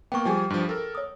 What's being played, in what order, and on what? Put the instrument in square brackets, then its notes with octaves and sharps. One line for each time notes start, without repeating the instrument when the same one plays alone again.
[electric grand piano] A#3 B3 [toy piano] G5 C#6
[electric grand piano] F3 G3 G#5 [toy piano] G#4 G5
[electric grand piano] G2 F3
A4 A#4
[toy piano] C#5 D#6